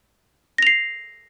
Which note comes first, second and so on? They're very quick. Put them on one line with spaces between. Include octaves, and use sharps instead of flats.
A#6 F7 C7